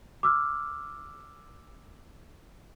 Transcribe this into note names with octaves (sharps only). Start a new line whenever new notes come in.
D6 E6 F6